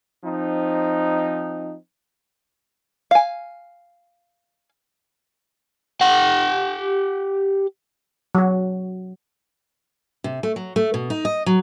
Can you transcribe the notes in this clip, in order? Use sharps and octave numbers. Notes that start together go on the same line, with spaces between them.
F3 C4 D#4
F5 G#5
G4 F#5
F#3 F#4
C3
A3
F#3
A3
B2
D#4
D#5
F#3